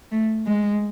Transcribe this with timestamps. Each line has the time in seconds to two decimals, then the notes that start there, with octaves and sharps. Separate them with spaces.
0.12 A3
0.46 G#3